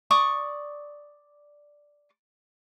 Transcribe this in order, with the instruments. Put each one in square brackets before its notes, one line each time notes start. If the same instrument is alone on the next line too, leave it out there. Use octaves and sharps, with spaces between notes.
[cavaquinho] D5 C#6 D#6